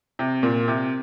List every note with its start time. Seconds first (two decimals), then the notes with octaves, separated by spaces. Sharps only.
0.19 C3
0.43 A#2
0.68 C3